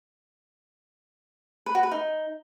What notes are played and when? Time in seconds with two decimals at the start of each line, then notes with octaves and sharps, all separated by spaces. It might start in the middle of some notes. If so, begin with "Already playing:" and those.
1.66 B4
1.75 F#4
1.83 B4
1.91 D#4